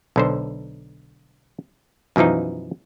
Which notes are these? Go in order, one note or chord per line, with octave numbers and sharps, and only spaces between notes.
B1 D3 C5
F#2 B2 E3 F3 D#4